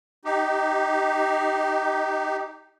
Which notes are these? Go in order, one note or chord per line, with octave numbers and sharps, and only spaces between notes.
D#4 G4